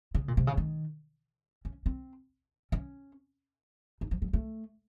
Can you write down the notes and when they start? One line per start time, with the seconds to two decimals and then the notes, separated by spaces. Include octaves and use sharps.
0.15 C#3
0.28 A#2
0.37 C3
0.47 C#3
0.57 D#3
1.65 C#4
1.86 C4
2.72 C#4
4.01 D#4
4.11 F3
4.22 F#3
4.33 A3